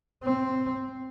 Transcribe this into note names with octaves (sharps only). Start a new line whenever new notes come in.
C4